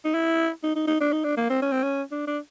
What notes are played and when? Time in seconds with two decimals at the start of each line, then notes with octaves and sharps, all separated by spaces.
0.05 D#4
0.14 E4
0.63 D#4
0.76 D#4
0.87 D#4
1.01 D4
1.12 D#4
1.24 D4
1.37 A#3
1.50 C4
1.62 C#4
1.72 C4
1.83 C#4
2.11 D4
2.27 D4